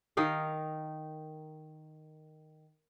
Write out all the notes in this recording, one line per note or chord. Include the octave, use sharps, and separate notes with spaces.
D#3 D#4 A#4 F5